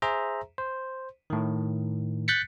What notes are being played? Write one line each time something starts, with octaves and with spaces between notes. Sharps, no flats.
G#4 C5 E5 A#5
C5
A2 D#3
F#6 G6 A6 B6 C#7